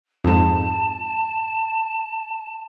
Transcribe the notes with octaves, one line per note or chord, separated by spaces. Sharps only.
F2 G#2 A5